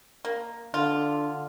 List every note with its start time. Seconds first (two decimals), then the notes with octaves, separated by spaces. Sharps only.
0.25 A#3
0.74 D3 F4